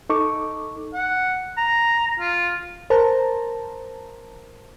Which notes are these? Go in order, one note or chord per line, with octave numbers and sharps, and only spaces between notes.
D#4 A4 C#6 D6
F#5
A#5
F4
A#4 C5 A5 A#5